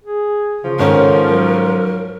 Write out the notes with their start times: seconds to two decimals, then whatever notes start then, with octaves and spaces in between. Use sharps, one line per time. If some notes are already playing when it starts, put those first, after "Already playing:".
0.04 G#4
0.64 C#3 F3
0.79 G#2 D#3 C#4 A4 A#4
1.26 F#3